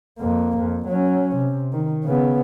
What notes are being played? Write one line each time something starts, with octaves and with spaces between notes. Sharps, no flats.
F2 A#3
F2
F#3 C#4
C3
D#3
C#3 B3